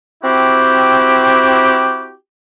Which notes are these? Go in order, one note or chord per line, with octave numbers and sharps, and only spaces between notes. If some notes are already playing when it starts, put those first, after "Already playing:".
C4 E4 F#4 G4